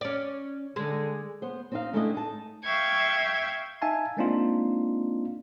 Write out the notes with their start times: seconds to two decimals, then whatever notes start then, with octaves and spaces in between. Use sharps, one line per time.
0.01 C#4 D5
0.76 D3 G#3
1.42 B3 C5
1.72 C4 D#4 F5
1.93 G#3 A3 C4 D4 E4 D#5
2.14 D#4 A5
2.64 E5 F5 G5 C#6 G#6
3.82 D#4 E5 F5 G#5 A5
4.17 G#3 A#3 C4 D4 D#4 F4